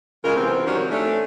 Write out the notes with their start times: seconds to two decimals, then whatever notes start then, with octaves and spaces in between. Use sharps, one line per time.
0.24 C#3 F#3 G#3 F4 A#4
0.36 C3 E3 B3 C4
0.67 D#3 F3 G3 C#4 F#4 G4
0.91 A3 C#4 D4